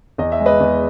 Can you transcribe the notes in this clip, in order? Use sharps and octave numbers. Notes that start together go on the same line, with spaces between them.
E2 D#5
E5
G#3
B4 D#5
E2